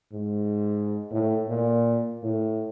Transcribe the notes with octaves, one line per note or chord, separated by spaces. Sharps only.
G#2
A2
A#2
A2